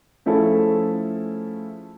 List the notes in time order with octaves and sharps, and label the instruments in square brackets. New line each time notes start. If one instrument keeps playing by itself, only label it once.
[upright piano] F3 A3 C#4 E4 G#4 A4